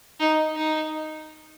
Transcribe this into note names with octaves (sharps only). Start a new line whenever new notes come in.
D#4
D#4